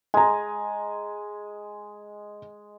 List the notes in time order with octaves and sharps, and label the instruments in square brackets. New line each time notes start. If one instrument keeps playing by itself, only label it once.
[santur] G#3 [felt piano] G#5 A#5